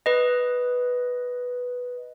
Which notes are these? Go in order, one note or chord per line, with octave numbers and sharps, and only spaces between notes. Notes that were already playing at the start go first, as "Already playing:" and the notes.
B4 D#5